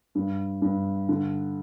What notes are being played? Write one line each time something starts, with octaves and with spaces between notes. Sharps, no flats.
G2
G2
D3